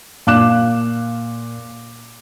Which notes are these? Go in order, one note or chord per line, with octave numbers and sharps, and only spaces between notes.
A#2 F5 D6 F#6 E7